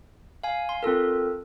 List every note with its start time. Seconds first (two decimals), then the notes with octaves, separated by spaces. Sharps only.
0.43 F5 G#5
0.69 C6
0.83 C4 F4 A4 A#4